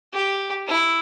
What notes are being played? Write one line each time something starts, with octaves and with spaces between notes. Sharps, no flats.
G4
E4